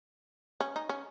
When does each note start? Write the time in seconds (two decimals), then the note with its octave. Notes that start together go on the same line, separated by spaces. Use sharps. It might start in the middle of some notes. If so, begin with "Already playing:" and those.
0.61 C#4
0.76 D#4
0.89 C#4